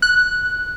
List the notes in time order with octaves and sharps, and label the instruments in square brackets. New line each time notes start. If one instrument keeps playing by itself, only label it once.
[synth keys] F#6